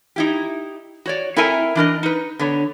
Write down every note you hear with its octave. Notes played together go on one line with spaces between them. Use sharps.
D#4 E4 G4
F#4 C#5 D5
C4 E4 A4 A#4 E5 G#5
E3 D4 A#4 D#5
D#4 B4
D3 B3 C#5